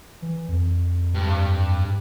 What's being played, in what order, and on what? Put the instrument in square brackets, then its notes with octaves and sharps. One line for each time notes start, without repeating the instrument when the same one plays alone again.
[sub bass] E3
F2
[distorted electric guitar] G2